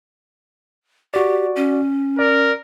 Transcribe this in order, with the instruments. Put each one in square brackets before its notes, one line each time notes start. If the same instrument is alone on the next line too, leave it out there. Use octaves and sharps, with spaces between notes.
[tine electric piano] F#4 D5 [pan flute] G4
[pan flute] C#4
[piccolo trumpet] A#4 [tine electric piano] D5